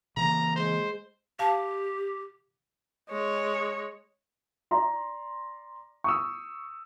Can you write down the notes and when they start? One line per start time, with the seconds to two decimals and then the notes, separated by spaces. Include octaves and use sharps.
0.17 C#3 E3 A#3 A#5
0.56 G#3 C5
1.39 G4 F5 A5
3.10 G#3 C#5
4.71 D5 A#5 C6
6.04 C#6 D#6 E6